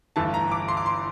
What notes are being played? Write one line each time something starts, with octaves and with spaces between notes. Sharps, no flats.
G1 G2 E3 A3 A5
A#5
D6
C6
D6
C6